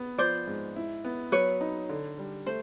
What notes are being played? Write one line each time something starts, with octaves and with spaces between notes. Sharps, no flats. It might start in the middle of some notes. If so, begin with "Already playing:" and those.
Already playing: B3
F3 C5 D5
G#2
E4
B3
F#3 B4 C#5
D#4
D3
G3
A3 C5